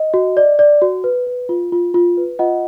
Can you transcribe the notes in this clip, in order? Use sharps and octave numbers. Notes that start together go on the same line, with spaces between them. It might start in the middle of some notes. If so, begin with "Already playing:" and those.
Already playing: D#5
F#4
D5
D5
F#4
B4
B4
F4
F4
F4
B4
F4 D#5 F#5